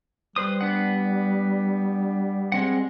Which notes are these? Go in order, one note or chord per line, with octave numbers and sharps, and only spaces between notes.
G3 B4 C5 D#6
B3 D4 F#5
G#3 C4 F#5